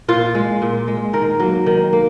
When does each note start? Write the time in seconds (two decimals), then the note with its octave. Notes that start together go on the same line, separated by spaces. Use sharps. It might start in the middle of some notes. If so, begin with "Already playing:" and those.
0.08 A#2 F4
0.35 G#3
0.62 A#2
0.87 G#3
1.13 D#3 A#4
1.40 F#3 A#3
1.66 D#3
1.93 A#3